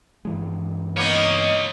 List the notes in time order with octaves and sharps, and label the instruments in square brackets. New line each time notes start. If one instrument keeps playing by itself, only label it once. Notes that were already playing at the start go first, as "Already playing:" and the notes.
[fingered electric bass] G2 E3 G#3
[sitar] A#3 B3 D#4 [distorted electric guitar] C#5 D#5